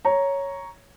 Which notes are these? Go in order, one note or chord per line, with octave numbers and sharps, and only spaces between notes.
C#5 A#5